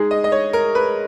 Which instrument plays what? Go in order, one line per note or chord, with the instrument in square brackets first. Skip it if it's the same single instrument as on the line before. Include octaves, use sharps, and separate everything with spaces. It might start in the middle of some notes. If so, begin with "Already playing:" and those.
Already playing: [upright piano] G#3 D#4 G#4
[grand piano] D#5
D#5
C#5
A#4
B4